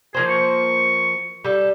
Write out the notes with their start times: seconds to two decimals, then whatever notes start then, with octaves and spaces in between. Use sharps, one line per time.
0.14 F3 A#3 G#4 C5
0.30 C#6
1.44 G3 A4